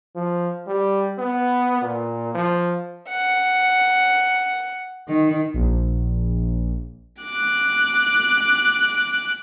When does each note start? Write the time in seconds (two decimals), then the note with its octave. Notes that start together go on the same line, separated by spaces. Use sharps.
0.16 F3
0.67 G3
1.19 B3
1.82 A#2
2.35 F3
3.09 F#5
5.07 D#3
5.54 A#1
7.23 D6 F#6